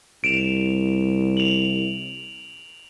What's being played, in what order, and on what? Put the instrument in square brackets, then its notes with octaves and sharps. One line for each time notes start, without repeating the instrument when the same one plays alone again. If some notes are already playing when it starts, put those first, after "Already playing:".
[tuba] C2 [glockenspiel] D7 E7 F7
[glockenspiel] F7 F#7